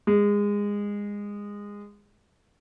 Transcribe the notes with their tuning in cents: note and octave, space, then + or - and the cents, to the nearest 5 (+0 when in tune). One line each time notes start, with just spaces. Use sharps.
G#3 -20